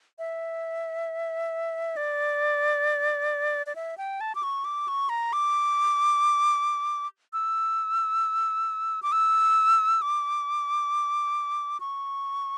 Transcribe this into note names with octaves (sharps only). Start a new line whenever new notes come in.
E5
D5
D5
E5
G5
A5
D6
C#6
D6
C#6
A#5
D6
E6
D6
E6
D6
C#6